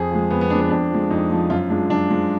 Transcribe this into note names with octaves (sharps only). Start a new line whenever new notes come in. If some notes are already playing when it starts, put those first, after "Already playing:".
Already playing: F2 G#4
F3 G#3
F2 B3
B3
F3 G#3 D4
B3
F2 D4
F3 G#3
F2 D#4
F3 G#3
F#2 F4
F3 G#3 D4
F#2 D4
F3 G#3